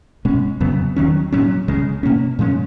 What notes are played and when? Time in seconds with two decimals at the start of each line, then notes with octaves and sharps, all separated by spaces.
0.25 B2 G#3 C#4
0.60 F2 C#3 F#3 B3
0.96 D#2 D#3 F#3 C#4
1.32 A#2 F#3 C#4
1.68 C#2 C#3 G#3
2.03 B2 A#3 C#4
2.39 A#2 F3 G#3 C#4